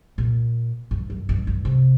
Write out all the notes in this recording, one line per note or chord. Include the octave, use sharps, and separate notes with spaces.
A#2
G2
F#2
G2
G2
C3